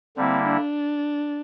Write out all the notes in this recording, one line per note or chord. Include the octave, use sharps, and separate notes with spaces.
D3 G3 A#3 C4 E4
D4